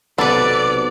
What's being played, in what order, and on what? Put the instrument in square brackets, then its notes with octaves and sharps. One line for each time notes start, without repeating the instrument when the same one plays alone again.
[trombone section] B1 C3 [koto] B3 B4 [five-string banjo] A4 [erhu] D5